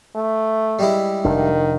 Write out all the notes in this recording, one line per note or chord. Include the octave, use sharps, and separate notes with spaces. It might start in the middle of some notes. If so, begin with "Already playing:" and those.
A3
G3 G#3 E4
F1 D#3 D4